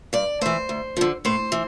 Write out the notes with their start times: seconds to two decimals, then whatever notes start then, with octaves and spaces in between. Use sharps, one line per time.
0.13 G2 D5
0.41 E3 A3 C5
0.69 D2
0.97 D3 F3
1.25 A2 C5
1.52 E3